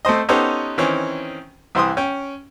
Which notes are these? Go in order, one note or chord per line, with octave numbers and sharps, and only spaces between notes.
A3 C4 C5 D#5
B3 C#4 D#4 G4 A4 C5
D#3 E3 C4 C#4
C2 E3 C5 G5 C6 D#6
C#4 G5